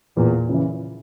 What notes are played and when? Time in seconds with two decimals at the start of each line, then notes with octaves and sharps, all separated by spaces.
0.17 E2 A#2
0.49 C#3 E3